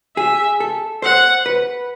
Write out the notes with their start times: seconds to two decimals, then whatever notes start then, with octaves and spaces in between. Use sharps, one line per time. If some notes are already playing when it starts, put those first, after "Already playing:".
0.16 G#4 E5
0.60 A4
1.02 C5 F#5
1.46 B4